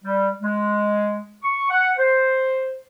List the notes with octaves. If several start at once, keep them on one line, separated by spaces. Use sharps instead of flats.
G3
G#3
C#6
F#5
C5